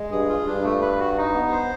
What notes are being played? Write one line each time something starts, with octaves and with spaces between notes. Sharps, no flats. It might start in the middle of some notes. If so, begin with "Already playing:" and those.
Already playing: G#3
G2 G#4
F4
G2 D4
A3
B4
F#4
D#4
B3
C5